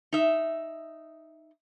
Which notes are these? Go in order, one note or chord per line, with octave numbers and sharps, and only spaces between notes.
D#4 E5